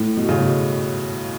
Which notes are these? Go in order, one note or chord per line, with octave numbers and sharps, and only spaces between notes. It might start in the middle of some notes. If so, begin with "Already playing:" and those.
Already playing: A2
B2
C#3
B2